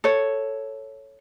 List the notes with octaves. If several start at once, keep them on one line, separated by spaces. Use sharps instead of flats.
A4 C#5